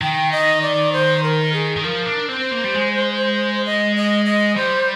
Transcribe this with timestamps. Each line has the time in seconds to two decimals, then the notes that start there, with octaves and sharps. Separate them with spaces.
0.01 D#3 G5
0.32 D#5
0.62 D5
0.93 C5
1.23 A#4
1.53 G#4
1.76 D#3
1.83 F3 A#4
2.06 D4
2.29 C4 C5
2.52 A#3
2.64 G3
2.74 G#3
3.65 D#5
3.96 D#5
4.26 D#5
4.56 G3 C5